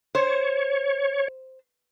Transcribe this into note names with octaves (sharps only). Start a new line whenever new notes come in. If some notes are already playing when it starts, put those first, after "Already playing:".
C5 C#5